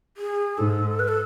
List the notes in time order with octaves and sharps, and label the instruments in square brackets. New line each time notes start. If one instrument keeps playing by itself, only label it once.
[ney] G#4
[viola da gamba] G#2 [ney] A4
[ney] B4
A4